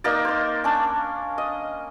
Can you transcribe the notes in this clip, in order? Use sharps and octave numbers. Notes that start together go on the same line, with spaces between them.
A#3 D#4 A#4 D5
C5 C6
C#4 D4
D#5